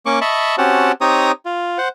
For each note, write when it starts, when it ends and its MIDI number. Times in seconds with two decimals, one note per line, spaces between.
0.06 0.19 58
0.06 0.19 61
0.06 0.19 85
0.06 0.19 86
0.21 0.56 75
0.21 0.56 76
0.21 0.56 81
0.21 0.56 83
0.21 0.56 85
0.58 0.92 60
0.58 0.92 61
0.58 0.92 66
0.58 0.92 67
0.58 0.92 78
0.58 0.92 81
1.01 1.32 60
1.01 1.32 63
1.01 1.32 67
1.01 1.32 73
1.01 1.32 82
1.01 1.32 87
1.45 1.78 65
1.78 1.88 72
1.78 1.88 78